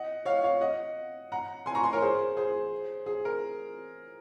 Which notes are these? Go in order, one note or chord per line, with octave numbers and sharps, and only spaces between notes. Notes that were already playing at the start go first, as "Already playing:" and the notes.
Already playing: D#5 F#5
C#5 F5
C#5 F5
D#5 F#5
F#5 A#5
G#5 C6
A#5 C#6
G#5 C6
A#4 C#5
G#4 C5
G#4 C5
G#4
A#4